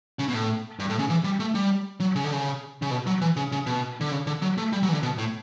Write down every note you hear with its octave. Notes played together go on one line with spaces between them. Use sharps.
C#3
B2
A2
G2
A2
C#3
E3
G3
A3
G3
F#3
C#3
D3
C#3
C#3
B2
F#3
E3
C#3
C#3
B2
D3
C#3
D3
F#3
A3
G3
F#3
E3
D3
B2
A2